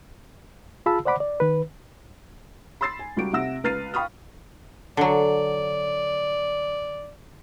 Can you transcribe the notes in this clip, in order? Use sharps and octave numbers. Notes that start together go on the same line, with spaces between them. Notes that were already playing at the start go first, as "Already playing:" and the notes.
F4 G#4 F5 A5 B5 E6
C5 D5 F#5 B5 D6
D5
D#3 B4
B5 C6 E6 A6 C7
G#5
C#2 G3 F#4 G4 D7
C3 F#5 E6 A#6
C#2 B4 F6 A6 C7 D#7
F5 G5 B5 C#6 D#6 F6
D3 F#3 D5